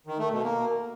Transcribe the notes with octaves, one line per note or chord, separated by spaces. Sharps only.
D#3
A3
B2
A#3